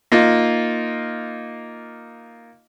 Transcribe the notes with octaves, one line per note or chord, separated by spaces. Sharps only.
A#3 D#4 F4